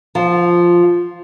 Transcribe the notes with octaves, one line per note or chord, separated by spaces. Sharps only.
F3